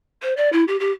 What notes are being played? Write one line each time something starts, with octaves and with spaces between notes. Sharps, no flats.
C5
D5
E4
G4
G4